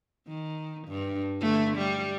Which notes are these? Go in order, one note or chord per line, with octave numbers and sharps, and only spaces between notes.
D#3
G2
D3 A3
G3